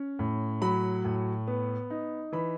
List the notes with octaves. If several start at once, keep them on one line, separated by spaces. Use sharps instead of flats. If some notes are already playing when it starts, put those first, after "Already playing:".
Already playing: C#4
A2
F#3 B5
A2
B3
D#4
E3 B5